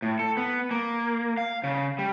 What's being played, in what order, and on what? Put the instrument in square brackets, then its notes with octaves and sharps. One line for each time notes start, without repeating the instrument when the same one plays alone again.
[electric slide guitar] A2
A4
B3
A#3
F5
C#3
G3